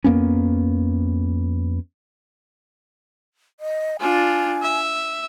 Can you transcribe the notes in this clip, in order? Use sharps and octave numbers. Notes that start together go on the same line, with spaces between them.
F2 A#3 B3 C#4
D#5
D4 F4 G#5
E5